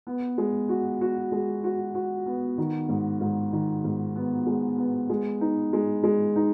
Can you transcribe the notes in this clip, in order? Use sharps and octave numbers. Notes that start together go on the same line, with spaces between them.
B3
G#3
F#4
F#4
G#3
F#4
F#4
B3
D#3
G#2
G#2
D#3
G#2
B3
G#3
B3
G#3
D#4
G#3
G#3
D#4